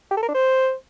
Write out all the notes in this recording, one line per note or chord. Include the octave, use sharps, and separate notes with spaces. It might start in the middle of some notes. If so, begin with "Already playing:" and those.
G4
A4
A#4
D4
C5